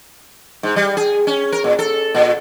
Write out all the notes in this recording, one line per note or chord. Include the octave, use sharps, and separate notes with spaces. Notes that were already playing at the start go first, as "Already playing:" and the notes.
G#2
G3
G#4
C#4
A#4
A#2
A4
A#2